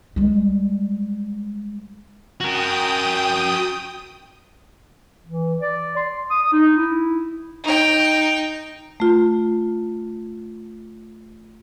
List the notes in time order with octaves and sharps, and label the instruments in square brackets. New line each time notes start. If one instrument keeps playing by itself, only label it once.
[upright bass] G3 G#3
[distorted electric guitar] F#4 A#4 [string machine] G5 D#6
[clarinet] E3
D5
C6
D#6
D#4
E4
[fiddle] D#4 G5
[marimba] A3 F4